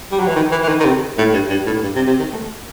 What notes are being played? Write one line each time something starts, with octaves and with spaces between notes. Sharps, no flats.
G3
F#3
E3
D#3
E3
E3
D#3
D#3
C3
A2
G2
G2
A2
G2
C3
C3
D#3
A3